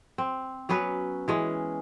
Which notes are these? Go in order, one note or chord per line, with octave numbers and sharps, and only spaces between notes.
C4
F#3 B3 C#4 B4
E3 G#3 C#4